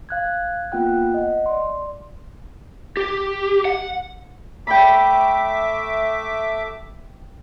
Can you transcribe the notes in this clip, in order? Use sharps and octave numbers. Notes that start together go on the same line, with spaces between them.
F5 F#6 G#6
A#3 B3 F4 F#5 G5 F#6
D#5 F#5
D5 C6
G4
F#5
A3 E5 G5 B5 D6